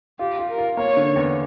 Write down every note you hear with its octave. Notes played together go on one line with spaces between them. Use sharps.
F4 G4
F4
A#4
F4
A#3 C#5
D3
E2